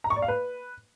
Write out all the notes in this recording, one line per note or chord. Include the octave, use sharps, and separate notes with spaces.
A#5
C#6
D5
F5
B4